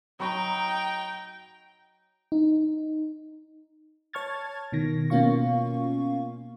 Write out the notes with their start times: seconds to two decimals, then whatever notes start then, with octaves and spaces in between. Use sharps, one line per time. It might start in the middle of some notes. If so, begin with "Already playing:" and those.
0.20 F#3 D#4 G5 B5 C#6
2.32 D#4
4.13 C#5 A5 C#6 F6 G#6 A6
4.72 B2 D#3 A#6
5.10 B2 A#3 C#4 F4 F5 C#6